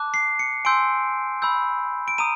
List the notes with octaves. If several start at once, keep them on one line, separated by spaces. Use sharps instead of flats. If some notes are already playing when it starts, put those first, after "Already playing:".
Already playing: A5 D6 F#6
C7
C#7
G#5 C6 E6 G6 D7
B5 E6 G6
D7
A#5 D#6 D#7